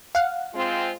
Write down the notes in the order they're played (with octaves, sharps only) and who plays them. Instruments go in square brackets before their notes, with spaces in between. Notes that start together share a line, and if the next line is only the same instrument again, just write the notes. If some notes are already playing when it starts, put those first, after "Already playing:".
[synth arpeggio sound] F5 F#5
[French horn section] G#3 C4 F4